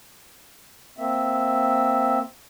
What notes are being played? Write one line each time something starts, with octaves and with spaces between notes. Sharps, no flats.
A#3 C4 E5